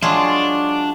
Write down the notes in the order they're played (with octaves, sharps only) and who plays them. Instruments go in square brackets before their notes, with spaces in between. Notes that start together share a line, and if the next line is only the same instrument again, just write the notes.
[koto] F#3 G#3 F4 [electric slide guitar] D4